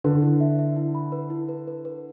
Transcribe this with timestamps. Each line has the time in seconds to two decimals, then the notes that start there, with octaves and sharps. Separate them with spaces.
0.04 D3 B4
0.22 E4
0.40 E5
0.59 E5
0.76 E4
0.95 B5
1.12 B4
1.30 E4
1.49 B4
1.68 B4
1.85 B4